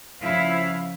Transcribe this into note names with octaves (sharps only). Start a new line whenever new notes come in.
C#3 F3 E4 F5